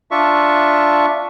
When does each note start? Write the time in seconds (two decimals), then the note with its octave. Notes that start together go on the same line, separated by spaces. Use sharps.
0.11 D4 F4 E5 C#6